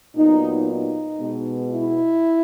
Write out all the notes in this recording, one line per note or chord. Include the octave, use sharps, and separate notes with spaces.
A#2 F#3 B3 D#4
D#4
B2 G#3 B3
E4